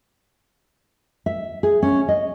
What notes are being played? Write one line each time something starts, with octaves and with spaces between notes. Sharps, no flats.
E5
G#4
C#4
D#5